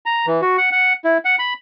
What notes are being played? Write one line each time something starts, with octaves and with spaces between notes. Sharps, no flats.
A#5
E3
F#4
F#5
F#5
E4
F#5
B5